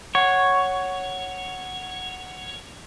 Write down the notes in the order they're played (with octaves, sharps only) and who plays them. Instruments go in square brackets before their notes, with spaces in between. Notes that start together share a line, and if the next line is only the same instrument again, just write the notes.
[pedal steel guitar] C#5 [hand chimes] F#5